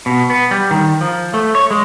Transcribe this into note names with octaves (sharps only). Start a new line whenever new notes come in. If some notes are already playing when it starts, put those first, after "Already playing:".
B2
B3
G3
D#3
F3
A3
C#5
G#3